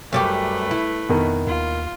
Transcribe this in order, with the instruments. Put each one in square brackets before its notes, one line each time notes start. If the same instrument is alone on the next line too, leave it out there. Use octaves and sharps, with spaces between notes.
[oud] F#2 G3 G4 [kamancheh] A3 B4
[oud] E4
[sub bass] F2 [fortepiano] B2 D#3
[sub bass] D#2 [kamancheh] F4